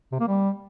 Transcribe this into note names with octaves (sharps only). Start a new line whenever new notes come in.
C3
A#3
G3